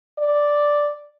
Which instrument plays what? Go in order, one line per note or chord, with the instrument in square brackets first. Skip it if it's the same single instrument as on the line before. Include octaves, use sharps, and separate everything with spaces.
[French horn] D5